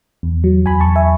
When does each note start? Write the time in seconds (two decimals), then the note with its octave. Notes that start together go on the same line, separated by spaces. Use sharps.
0.23 E2
0.44 F#3
0.66 E2 G#5 B5
0.80 A5 C#6
0.88 E2
0.96 E5 G#5